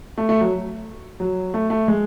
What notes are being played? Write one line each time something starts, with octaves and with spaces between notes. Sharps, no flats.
A3
A3
F#3
F#3
A3
A3
G#3